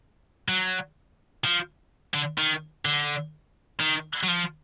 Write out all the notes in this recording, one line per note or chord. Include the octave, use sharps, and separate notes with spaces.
F#3
F3
D3
D#3
D3
D#3
F#3
F3